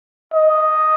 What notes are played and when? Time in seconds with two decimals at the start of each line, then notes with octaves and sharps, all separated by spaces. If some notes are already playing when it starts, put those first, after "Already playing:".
0.34 D#5